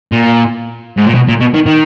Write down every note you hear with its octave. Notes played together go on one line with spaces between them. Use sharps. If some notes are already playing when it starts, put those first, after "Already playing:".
A#2
G#2
A#2
B2
A#2
B2
D#3
D#3